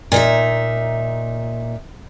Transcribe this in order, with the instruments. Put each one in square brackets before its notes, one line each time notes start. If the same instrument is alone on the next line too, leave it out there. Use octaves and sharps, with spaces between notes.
[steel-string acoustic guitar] A#2 D#4 E5